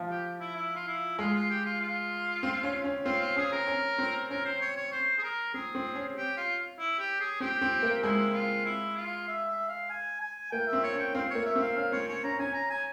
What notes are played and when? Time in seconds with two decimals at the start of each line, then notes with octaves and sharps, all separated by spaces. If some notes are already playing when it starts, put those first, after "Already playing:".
Already playing: F3
0.09 G4
0.40 E4
0.56 E4
0.76 F4
0.88 E4
1.19 G#3 F4
1.34 F4
1.50 G4
1.66 F4
1.81 F4
2.43 C4
2.63 C#4
2.84 C#4
3.05 C4 F4
3.21 F4
3.36 C#4 G#4
3.52 A#4
3.67 C#4
3.98 C4
4.30 C#4 A#4
4.45 C5
4.61 C#5
4.77 C#5
4.92 C5
5.18 G#4
5.23 A#4
5.54 C4 G#4
5.75 C4
5.95 C#4
6.16 G4
6.37 F4
6.79 E4
6.99 G4
7.20 G#4
7.40 C4 G4
7.61 C4
7.83 A#3
8.03 G#3 E4
8.34 F4
8.65 E4
8.97 F4
9.28 E5
9.49 E5
9.69 F5
9.90 G#5
10.21 G#5
10.52 A#3 G5
10.68 E5
10.73 C4
10.83 C#5
10.94 C#4
10.99 G5
11.15 C4 F5
11.30 A#3 C#5
11.46 E5
11.56 C4
11.61 F5
11.77 C#4 F5
11.92 C4 C#5
12.08 C#4 C#5
12.24 C#4 A#5
12.39 C#4 G#5
12.54 A#5
12.70 G#5